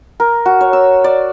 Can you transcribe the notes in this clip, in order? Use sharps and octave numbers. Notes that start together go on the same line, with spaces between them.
A#4
F#4
C#5
E6
D5